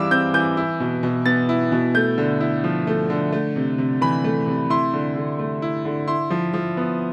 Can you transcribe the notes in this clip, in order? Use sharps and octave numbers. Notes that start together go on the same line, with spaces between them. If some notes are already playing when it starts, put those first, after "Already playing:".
Already playing: E3 G3 C4 E4 F5 D6 E6
C4 G6
E3 G6
E4
B2
B2
B3 A6
E4
B2
A3 G6
D3
E4
F3
A3
D3
A3
C3
C3
E3 B5
A3
C3
E4 C6
D3
D3
A3
E4
D3
E4 C6
F3
F3
B3